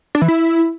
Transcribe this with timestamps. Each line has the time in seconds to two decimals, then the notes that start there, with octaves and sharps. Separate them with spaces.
0.15 D4
0.22 E3
0.28 E4